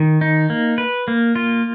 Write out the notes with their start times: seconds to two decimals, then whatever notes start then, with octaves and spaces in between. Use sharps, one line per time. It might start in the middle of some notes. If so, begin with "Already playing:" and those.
Already playing: D#3
0.21 D#4
0.50 A#3
0.78 B4
1.08 A#3
1.35 F4